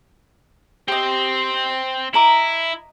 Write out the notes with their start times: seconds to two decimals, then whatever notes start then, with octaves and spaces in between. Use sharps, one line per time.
0.88 C4 G4 C5 D#5
2.14 E4 D#5 A#5 D6